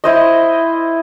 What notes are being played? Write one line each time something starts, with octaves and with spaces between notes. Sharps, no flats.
E4 C5 D#5